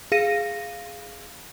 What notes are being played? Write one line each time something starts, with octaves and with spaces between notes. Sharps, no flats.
G#4 F5 A#6 D#7